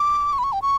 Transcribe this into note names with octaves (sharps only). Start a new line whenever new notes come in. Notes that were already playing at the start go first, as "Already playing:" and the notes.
Already playing: D6
C#6
B5
C#6
G5
C#6